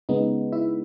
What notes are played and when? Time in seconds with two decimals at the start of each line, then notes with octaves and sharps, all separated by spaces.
0.09 C#3 G#3 B3 D#4
0.52 E4 E5